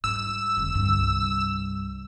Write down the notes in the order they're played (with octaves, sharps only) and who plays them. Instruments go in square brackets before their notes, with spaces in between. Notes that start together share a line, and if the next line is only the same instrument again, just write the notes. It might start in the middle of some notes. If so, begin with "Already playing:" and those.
[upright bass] G#2 G3 [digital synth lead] E6
[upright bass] F1 D3
C2 G2